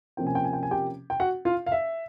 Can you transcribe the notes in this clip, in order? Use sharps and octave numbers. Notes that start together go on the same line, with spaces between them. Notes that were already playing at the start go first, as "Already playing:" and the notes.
C3 F3 A#3 C#4 G5
G#5
G5
G#5
G5
G#5
G4 G5
G5
F#4 F#5
F4 F5
F5
E5